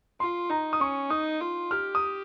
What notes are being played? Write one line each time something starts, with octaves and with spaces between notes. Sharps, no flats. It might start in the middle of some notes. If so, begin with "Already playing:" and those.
F4 C6
D#4 A#5
D#6
C#4 C#6
D#4 D#6
F4
G4 F6
D#6